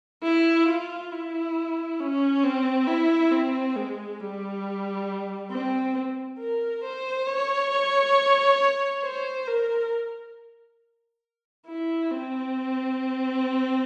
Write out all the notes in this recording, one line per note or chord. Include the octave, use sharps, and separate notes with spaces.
E4
F4
E4
C#4
C4
E4
C4
G#3
G3
C4
A#4
C5
C#5
C5
A#4
E4
C4